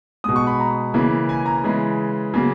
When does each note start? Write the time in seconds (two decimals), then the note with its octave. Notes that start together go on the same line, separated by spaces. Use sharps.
0.24 B2 G#3 D#6
0.36 C#6
0.47 B5
0.60 A#5
0.94 C#3 E3 A#3
1.29 G#5
1.46 A#5
1.64 C#3 E3 G#3
2.34 C#3 F#3 A#3